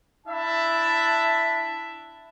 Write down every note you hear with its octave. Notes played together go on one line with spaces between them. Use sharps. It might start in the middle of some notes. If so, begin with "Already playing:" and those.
D4 E4 E5 A5